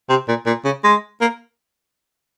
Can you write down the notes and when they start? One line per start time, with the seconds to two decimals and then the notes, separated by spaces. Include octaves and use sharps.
0.09 C3
0.28 A#2
0.46 A#2
0.65 C#3
0.84 G#3
1.21 A#3